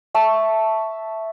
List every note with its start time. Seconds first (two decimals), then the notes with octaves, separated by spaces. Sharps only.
0.15 E5 A5 C#6